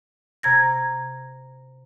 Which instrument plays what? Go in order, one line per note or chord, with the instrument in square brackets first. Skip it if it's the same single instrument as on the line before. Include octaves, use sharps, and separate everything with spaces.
[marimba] C3 A#5 G#6 A#6